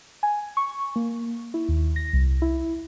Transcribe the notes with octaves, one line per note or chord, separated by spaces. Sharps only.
G#5
C#6
A#3
E4
D#2
A#6
C2
E4